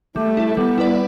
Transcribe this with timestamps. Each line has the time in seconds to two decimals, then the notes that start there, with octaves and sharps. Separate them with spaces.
0.16 G3 A3
0.37 E4 A4
0.57 G3 B3
0.78 E4 B4 D5